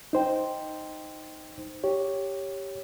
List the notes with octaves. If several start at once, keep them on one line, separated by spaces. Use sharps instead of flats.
D#4 C5 G5
G4 C#5